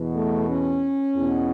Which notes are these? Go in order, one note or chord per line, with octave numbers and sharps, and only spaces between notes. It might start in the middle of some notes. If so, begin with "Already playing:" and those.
Already playing: E2 B2
A3
C#4
E2 B2